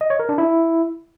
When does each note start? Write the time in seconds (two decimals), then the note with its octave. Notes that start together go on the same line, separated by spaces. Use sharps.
0.01 D#5
0.10 C#5
0.20 A#4
0.29 D4
0.38 E4